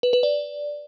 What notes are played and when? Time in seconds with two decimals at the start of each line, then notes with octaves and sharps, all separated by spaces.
0.03 B4
0.13 B4
0.23 D5